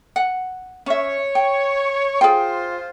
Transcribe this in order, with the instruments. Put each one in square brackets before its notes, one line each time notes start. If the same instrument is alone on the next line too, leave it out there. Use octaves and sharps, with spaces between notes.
[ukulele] F#5
[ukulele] C#4 E5 [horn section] C#5
[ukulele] G5
[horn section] F4 C5 [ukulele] G#4 G5